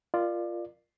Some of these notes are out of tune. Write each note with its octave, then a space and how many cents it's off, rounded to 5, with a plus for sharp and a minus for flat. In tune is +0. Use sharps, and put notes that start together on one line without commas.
F4 -10 A#4 +0 D5 +25